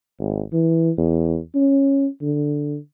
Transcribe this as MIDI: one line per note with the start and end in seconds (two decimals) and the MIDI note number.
0.19 0.42 32
0.53 0.91 52
0.98 1.38 40
1.55 2.07 61
2.22 2.77 50